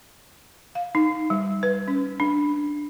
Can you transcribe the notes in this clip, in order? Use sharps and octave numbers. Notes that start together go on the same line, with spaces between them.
F5
D#4
G3
B4
C#4
D4